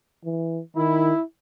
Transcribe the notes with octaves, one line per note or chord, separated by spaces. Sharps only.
E3
D#3 E4